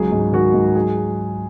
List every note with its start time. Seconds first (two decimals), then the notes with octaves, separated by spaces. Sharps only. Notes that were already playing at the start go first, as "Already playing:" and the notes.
Already playing: C#2 F#3 G#4
0.12 G#2
0.32 D#3 F#4
0.54 G#2
0.75 F#3 G#4